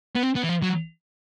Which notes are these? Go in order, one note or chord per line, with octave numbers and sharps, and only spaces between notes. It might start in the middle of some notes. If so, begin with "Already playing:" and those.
B3
C4
B3
E3
F3
F#3